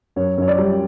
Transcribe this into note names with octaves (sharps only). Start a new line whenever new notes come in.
F#2 C#5
F#2 C#5
D5
G3